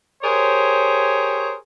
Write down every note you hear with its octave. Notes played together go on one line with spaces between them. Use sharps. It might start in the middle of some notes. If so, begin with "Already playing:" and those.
G4 G#4 A#4 C5 C#5